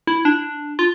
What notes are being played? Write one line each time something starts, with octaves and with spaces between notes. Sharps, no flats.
E4
D4
F4